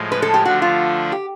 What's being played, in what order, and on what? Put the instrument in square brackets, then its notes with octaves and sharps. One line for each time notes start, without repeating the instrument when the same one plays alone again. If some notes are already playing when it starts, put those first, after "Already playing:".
Already playing: [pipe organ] A2 F3 G#3
[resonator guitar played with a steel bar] B4
A4
G4
[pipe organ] D3 F3 A3 D4 [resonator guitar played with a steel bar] F#4
[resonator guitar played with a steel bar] F4
G4